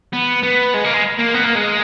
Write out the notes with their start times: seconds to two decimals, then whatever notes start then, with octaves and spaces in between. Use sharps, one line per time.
0.13 B3
0.43 B3
0.74 G#3
0.84 A#3
0.94 G#3
1.19 A#3
1.34 B3
1.45 A#3
1.55 G#3